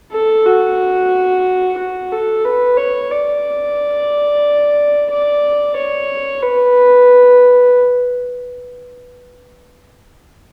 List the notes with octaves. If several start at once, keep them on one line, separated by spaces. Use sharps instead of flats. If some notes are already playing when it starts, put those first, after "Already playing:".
A4
F#4
F#4
A4
B4
C#5
D5
D5
C#5
B4